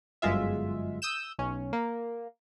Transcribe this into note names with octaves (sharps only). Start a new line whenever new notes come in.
G1 F#2 G#3 F4 E5
D#6 E6 G6 E7
B1 C#4
A#3